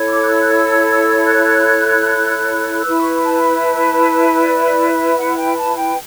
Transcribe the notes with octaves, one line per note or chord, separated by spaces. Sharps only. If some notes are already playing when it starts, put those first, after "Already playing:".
Already playing: E4 A4 C#5
D6
F#6
E6
F#6
E6
E6
F#6
E4 B4 E6
C#6
A5
B5
A5
D5
D5
E5
F#5
G5
A5
G5